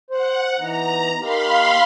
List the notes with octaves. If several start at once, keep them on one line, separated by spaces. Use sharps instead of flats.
C5 F#5
E3 B3 D#4 A#5
A#3 D#4 G4 F5 B5 C6